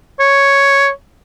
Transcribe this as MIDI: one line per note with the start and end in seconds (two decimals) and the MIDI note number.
0.20 0.89 73